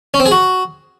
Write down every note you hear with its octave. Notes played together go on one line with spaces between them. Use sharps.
C#4
C4
G#4
F#4